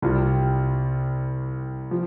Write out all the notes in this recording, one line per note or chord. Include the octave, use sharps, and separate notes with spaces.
C2 C3 G3 F4
F3